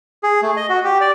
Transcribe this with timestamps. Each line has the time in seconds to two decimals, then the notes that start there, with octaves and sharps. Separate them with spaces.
0.23 G#4
0.42 A3
0.57 D#5
0.69 F#4
0.85 G4
1.01 D5